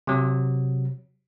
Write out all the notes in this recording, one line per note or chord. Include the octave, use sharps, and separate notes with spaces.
C3 F#3